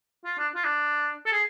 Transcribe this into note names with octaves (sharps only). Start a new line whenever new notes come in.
F4
D4
F4
D4
A4
G#4